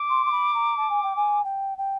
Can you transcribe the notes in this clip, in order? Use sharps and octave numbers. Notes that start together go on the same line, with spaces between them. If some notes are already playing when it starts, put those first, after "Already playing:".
Already playing: D6
C6
C6
B5
A#5
A5
G#5
G5
G#5
G5
G5